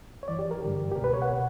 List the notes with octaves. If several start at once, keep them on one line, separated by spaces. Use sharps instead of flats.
C#5
F#2 E3 D5
G4
A#4
G2 D3 G4
G4
C#2 B2 A#4
B4
C#5
F#5
B2